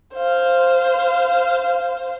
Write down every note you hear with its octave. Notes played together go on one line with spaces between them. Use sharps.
C5 F5